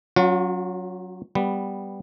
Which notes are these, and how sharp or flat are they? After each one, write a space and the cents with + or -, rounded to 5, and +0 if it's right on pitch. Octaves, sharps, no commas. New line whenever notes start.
F#3 +0 C#4 +0 F4 +45
G3 +0 B3 +0